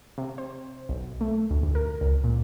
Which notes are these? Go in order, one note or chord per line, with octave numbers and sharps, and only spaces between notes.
C3
C5
B1
A3
D2
D2
A#4
C#2
A#2